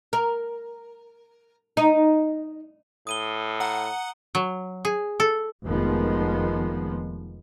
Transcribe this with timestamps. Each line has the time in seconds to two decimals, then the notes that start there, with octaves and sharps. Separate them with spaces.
0.13 A#4
1.77 D#4
3.07 A2 D#6 D#7 G7
3.60 F#5 A#5
4.35 F#3
4.85 G#4
5.20 A4
5.67 F1 D#3 F3 G#3 B3